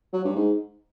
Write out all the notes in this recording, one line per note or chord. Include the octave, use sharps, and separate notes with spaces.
F#3
G2
G#2